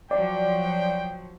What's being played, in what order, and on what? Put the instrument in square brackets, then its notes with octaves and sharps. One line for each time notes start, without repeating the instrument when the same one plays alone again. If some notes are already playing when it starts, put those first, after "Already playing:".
[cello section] F3 F#3 [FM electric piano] D5 [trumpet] G5